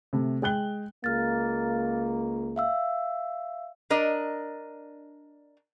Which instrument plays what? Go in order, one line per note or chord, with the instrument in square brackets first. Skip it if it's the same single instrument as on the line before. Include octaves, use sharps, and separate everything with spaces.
[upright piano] C3 A3
G#3 G5 F#6 G7
[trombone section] C#2 A#3 [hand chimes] F6 A6
[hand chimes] E5 F5 E6
[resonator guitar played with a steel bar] D4 A#4 D5 D#5